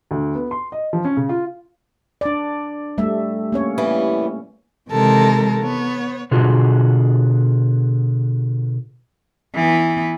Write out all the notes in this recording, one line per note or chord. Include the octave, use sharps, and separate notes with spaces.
D2
B3
C6
D#5
F3
C#4
C#3
F4
D4 D5
G3 A3 E5
A#3 C#4 C#5
E3 G3 B3
C3 D#3 E3 G#3 A4 A#4
B3 C#5
B2 D3 F4 F#4 G#4
E3 B3